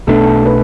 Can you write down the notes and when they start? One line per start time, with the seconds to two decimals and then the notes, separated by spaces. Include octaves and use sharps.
0.07 B1 B2 A3 D4 A4
0.46 B4